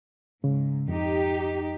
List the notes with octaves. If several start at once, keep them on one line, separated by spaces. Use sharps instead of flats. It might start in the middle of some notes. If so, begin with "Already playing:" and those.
G#2 C#3
F2 D#4 G4